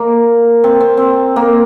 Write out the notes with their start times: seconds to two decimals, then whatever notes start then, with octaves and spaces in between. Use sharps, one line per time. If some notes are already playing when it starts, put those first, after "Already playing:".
Already playing: A#3
0.64 C4
0.80 C4
0.97 C4
1.36 A#3